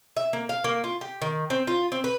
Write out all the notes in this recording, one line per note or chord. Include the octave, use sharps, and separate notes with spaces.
E5
A#3
F5
A#3
F4
G4
D#3
C4
F4
C4
B4